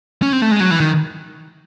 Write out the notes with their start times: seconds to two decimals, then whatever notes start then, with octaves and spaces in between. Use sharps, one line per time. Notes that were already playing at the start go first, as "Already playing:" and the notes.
0.22 C#4
0.33 C4
0.42 A3
0.51 G#3
0.60 F#3
0.71 E3
0.80 D#3